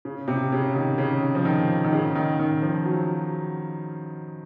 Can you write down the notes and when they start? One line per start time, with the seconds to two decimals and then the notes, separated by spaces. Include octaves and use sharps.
0.05 C#3
0.28 C3
0.52 C#3
0.75 D#3
0.98 C#3
1.35 F3
1.45 D#3
1.84 D#3
1.92 C#3
2.15 D#3
2.39 D#3
2.62 F3
2.85 F#3